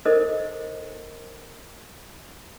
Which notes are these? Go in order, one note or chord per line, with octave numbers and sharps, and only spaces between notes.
D#4 A4 A#4 C5 D#5